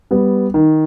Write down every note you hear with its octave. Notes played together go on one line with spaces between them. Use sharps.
G3 B3
D#3